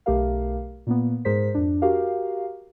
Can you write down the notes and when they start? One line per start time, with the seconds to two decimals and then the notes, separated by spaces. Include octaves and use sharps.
0.06 B1 A3 G4 A#4 F5
0.87 A#2 A#3 B3
1.25 G#2 G#3 G#4 A#4 C5 B6
1.54 F2 D4
1.82 F#4 G4 A#4 F5